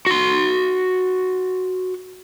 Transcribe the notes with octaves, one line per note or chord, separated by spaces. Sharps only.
F#4 C6